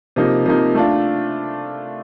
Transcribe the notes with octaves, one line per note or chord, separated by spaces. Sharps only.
C3 F3 A#3 D#4
C3 F3 A#3 D#4
A3 D4 F4